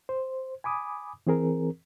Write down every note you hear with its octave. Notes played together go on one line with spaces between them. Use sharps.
C5
G#5 B5 D6 D#6
E3 C4 G#4 A#4